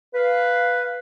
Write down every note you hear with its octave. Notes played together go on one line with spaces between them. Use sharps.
B4 F5